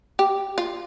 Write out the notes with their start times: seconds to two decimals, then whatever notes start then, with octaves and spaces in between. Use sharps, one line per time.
0.19 G4
0.58 F4